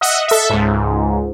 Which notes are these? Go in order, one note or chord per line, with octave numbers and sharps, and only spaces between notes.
D#5 E5 F#5
A4 E5
C#2 G#2